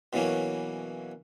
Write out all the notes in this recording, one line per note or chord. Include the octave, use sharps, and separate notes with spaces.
B2 E3 F#3 A#3 C#4